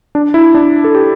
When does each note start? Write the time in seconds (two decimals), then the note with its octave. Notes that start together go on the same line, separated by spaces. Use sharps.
0.15 D4
0.34 E4
0.55 D4
0.84 A4
0.95 G4